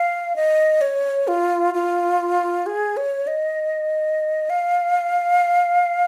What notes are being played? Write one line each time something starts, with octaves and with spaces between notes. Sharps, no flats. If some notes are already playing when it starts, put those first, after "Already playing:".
Already playing: F5
D#5
C#5
F4
F4
G#4
C#5
D#5
F5